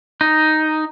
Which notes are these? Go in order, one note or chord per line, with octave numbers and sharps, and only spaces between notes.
D#4